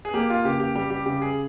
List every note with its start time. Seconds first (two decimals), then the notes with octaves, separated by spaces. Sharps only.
0.05 G#4
0.14 A#3 G4
0.30 F4
0.44 C#3 G4
0.60 G4
0.75 G3 G4
0.90 G4
1.06 C#3 G4
1.22 G#4